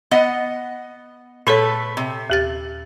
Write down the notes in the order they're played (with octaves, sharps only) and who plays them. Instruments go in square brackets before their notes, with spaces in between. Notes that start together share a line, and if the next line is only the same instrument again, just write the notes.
[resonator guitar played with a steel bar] B3 D#5 F#5
[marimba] A#2 A4 C#5 [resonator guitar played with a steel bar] A3 B4
[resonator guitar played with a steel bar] C3
[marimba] D#2 G4 A6